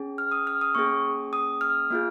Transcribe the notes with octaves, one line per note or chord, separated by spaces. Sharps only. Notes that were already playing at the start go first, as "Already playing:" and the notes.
Already playing: C#4 G#4
F6
D#6
F6
D#6
A#3 C#4 G#4 C#6
D#6
F6
A#3 F4 G#4